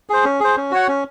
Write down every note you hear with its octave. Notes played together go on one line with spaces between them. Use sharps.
G#4 C5
C#4
G#4 C5
C#4
F#4 C#5 F#5
C#4